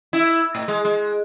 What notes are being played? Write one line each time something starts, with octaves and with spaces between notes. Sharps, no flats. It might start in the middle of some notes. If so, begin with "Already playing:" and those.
E4
A2
G#3
G#3